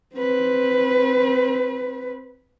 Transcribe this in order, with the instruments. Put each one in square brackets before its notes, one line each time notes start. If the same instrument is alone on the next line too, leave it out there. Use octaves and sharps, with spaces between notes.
[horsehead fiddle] C4 B4